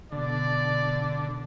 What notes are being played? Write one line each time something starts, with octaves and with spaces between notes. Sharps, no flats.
B2 D3 D5